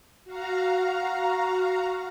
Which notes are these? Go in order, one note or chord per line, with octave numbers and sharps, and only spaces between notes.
F#4 F5 A#5